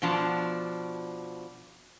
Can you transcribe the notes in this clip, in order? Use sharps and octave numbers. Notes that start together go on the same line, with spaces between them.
B2 F3 D4